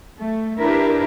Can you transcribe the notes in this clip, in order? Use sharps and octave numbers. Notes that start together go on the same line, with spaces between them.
A3
D4 E4 G4 A#4 B4